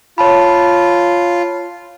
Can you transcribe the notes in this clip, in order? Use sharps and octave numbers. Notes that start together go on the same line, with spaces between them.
F4 C#5 A5 B5